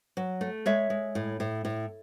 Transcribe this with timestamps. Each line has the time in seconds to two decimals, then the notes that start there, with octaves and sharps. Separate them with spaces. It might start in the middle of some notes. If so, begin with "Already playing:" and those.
0.17 F#3
0.41 A3
0.66 G#3 C#5 E5
0.90 G#3
1.15 A2
1.40 A2
1.65 A2